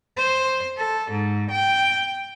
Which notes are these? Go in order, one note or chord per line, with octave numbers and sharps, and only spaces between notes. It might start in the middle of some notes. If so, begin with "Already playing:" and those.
C5
A4
G#2
G5